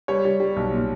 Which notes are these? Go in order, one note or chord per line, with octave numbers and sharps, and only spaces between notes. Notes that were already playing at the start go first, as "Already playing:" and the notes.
G3 C#5
G3
G3
B1
A#2